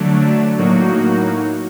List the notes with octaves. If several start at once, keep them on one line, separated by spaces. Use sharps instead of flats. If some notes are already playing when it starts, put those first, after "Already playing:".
Already playing: D3 F#3 A3 D4
A2 F#3 A#3 D#4 F#4